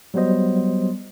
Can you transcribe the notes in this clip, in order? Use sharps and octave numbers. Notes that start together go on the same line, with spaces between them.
F#3 G3 B3 C5 D#5